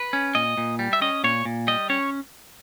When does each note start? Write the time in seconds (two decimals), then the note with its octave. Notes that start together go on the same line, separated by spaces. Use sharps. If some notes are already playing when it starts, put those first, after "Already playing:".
Already playing: B4
0.13 C#4
0.35 A#2 D#5
0.57 A#2
0.79 G3
0.93 E5
1.01 C#4 D#5
1.24 A#2 C#5
1.45 A#2
1.67 G3 D#5
1.90 C#4 C#5